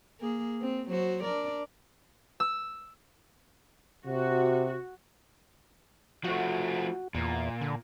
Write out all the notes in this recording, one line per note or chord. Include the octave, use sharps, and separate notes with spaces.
A#3 G#4
C4
F#3 F#4 C5
D4 A#4 D5
E6
C3 F#4
F3 A3 F#4
E2 A#2
D3